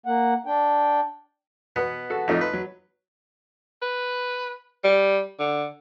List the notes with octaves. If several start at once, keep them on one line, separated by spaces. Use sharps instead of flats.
A#3 F#5
D4 G5
B2 B3 B4
F#4 A4
F2 A2 A3 D#4 F4
B4
F#3
B4
G3
D3